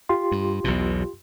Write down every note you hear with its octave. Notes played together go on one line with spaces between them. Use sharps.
F4 G4 C6
G2
B1 E2 B2